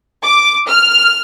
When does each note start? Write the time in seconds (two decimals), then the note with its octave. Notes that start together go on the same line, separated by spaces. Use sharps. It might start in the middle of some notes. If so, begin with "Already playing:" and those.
0.23 D6
0.68 F6